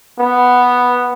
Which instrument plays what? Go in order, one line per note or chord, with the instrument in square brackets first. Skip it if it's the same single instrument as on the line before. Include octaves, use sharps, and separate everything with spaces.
[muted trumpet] B3